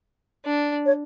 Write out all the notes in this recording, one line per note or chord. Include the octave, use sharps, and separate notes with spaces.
D4
C#5